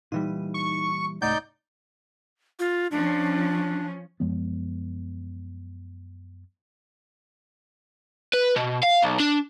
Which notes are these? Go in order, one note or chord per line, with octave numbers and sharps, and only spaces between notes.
A#2 E3 G3 D#4
C#6
C2 G#2 A3 D#4 D5 F#5 G6
F4
F3 C#4 D4
F#2 F3 G#3 B3
B4
B2
F5
B1
D4